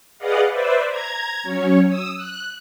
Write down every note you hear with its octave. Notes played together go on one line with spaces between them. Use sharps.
G#4 B4 D5 D#5 F5 F#5
B4 C5 D5 E5
A#5 G#6
F#3 C#4 C#5
D#6 E6
F#6